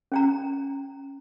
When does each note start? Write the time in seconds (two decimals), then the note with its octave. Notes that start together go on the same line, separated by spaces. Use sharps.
0.12 C#4 G5 A#5